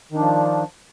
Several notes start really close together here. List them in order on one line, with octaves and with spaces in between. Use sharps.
D#3 D4 F3